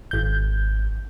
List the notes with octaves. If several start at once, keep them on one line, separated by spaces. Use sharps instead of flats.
G#1 G6